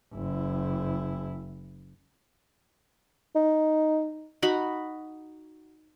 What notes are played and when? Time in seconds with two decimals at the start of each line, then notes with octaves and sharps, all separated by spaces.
0.13 F#1 E4
3.35 D#4
4.42 D#4 F#4 B5